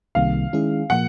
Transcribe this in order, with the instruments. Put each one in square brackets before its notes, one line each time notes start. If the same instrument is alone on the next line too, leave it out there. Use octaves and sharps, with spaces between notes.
[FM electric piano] C2 C3 D#3 G3 A#3 [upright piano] F5
[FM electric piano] D#3 G#3 C#4 E4 G#4
[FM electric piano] A#2 F3 A#3 [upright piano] F#5